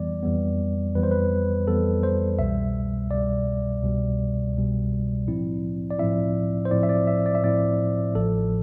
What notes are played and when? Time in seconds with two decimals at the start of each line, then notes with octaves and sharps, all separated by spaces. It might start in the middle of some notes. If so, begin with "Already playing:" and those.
Already playing: F2 E3 G3 B3 D5
0.23 F2 E3 G3 B3
0.95 F2 E3 G3 B3 B4
1.03 C5
1.11 B4
1.68 F2 E3 G3 B3 A4
2.03 C5
2.39 C2 B2 G3 E5
3.11 C2 B2 G3 D5
3.83 C2 B2 G3
4.55 C2 B2 G3
5.27 A2 F3 C4 E4
5.91 D5
5.99 A2 F3 C4 E4 E5
6.65 C5
6.71 A2 F3 C4 E4 D5
6.83 E5
6.89 D5
7.07 E5
7.26 D5
7.35 E5
7.43 A2 F3 C4 E4 D5
8.15 A1 A2 F3 A4